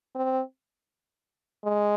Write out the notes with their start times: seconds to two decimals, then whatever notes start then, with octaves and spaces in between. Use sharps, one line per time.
0.15 C4
1.65 G#3